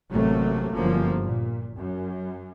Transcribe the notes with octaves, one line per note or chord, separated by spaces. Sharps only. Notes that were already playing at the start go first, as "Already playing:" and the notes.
A1 C3 F#3 A3 A#3
G1 F#2 F3 A#3
A#2
F#2